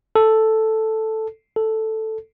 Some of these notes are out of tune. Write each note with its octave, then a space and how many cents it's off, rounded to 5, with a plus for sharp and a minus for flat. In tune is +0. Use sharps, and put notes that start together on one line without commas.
A4 +0
A4 +0